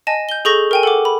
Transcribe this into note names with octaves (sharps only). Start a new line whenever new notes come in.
D#5 G#5 A5
G6 G7
G#4 A4 C#6 G6 A#6
A#4 G5 G#5
A4 F#5 D6
B5